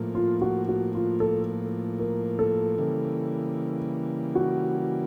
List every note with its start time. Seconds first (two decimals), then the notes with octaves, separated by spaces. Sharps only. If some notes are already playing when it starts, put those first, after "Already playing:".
Already playing: A2 F3 A#3
0.15 F4
0.41 F#4
0.68 F#4
0.95 F4
1.20 A4
1.99 A#4
2.39 A4
2.78 C#3 E3 G3 A#3
4.35 F#4